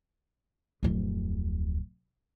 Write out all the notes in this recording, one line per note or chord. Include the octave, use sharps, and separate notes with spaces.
D1 F2